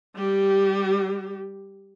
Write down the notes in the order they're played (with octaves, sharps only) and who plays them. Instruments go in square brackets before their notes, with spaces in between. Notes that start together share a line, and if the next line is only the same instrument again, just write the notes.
[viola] G3 G4